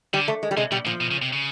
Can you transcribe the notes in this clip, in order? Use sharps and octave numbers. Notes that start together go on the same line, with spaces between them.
D3 G3
A3
G#3
G3
C3 G#3
B2 G3
A#2 F3
B2
C#3
C3
C#3